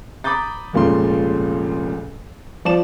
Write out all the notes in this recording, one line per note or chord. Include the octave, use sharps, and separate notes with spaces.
A#5 B5 D6 D#6 G6 A6
F1 C#2 A#2 C#3 C6
F3 D5 A5 E7